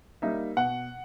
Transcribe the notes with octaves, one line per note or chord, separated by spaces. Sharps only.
G3 A#3 D#4 E5
B2 F#5